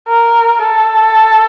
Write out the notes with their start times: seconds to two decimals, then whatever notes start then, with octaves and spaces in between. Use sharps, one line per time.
0.08 A#4
0.62 A4